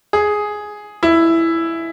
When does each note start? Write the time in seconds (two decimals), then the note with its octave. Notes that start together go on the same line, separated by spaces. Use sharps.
0.13 G#4
1.03 E4